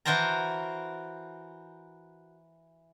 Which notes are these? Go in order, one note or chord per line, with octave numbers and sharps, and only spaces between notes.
E3 F#4 A#4 C5 A5 A#5